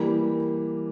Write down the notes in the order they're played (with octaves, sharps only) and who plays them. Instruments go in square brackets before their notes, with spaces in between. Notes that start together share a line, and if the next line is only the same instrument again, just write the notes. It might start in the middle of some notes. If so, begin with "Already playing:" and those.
Already playing: [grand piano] E3 G3 A#3